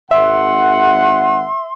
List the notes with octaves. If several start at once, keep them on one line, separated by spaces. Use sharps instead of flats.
G#1 E5 F#5 C6